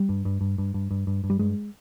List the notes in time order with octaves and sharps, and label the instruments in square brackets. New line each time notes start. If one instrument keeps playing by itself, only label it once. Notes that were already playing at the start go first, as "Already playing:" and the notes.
Already playing: [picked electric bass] G3
G2
G2
G2
G2
G2
G2
G2
G2
G3
G2 G#3